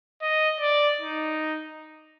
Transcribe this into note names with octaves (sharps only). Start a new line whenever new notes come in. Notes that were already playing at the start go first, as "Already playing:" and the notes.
D#5
D5
D#4